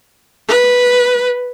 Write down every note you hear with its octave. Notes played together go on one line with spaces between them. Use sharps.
B4